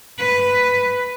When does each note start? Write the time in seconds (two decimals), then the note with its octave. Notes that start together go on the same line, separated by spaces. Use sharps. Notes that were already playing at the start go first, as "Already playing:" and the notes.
0.18 B4